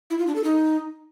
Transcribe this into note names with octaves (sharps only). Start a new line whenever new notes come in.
E4
F4
D4
A4
D#4